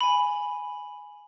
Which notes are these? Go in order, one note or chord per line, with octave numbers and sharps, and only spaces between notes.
G#5 B5